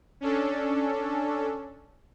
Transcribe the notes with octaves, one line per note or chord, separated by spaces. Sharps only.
C#4 D4 A4